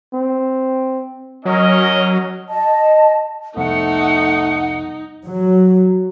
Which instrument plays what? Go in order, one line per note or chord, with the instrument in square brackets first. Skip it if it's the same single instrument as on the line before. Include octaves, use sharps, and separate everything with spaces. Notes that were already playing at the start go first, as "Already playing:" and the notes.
[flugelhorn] C4
[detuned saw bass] F#3 [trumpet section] C#4 A#4 D#5
[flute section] D#5 A5
[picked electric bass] C2 F2 B3 [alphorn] A3 [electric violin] D#4 [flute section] F#5
[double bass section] F#3